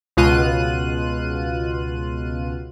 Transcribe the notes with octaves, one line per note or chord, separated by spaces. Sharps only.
C#2 B2 F4 F#6 D#7